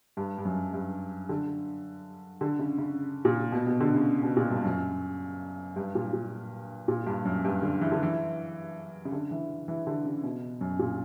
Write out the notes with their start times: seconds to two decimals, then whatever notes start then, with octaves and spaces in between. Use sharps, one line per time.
0.17 G2
0.38 G2
0.45 F#2
0.73 G2
1.29 D3
2.41 D3
2.59 C#3
2.78 C#3
3.25 A#2
3.52 B2
3.67 B2
3.80 D3
3.95 C#3
4.23 B2
4.37 A#2
4.50 G2
4.64 F#2
5.76 G2
5.95 A#2
6.13 A#2
6.88 A#2
7.06 G2
7.25 F#2
7.45 G2
7.62 D3
7.81 E3
7.92 D3
8.03 E3
9.05 C#3
9.12 D3
9.31 E3
9.68 E3
9.87 D3
10.05 C#3
10.24 B2
10.61 F#2
10.79 A#2